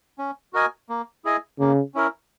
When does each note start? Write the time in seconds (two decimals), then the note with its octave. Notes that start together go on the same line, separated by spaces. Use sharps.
0.19 C#4
0.53 F#4 A#4 D#5 G#5
0.89 A#3
1.25 E4 G#4 D#5 G#5
1.59 C#3 A#3
1.95 C#4 E4 A#4